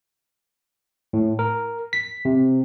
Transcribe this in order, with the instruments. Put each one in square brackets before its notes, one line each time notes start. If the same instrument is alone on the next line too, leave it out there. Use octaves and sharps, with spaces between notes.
[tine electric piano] A2
A#4
B6
C3